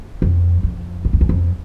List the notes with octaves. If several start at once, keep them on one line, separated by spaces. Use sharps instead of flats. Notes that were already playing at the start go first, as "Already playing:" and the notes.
F2
F2
G#2
F2
E2
F2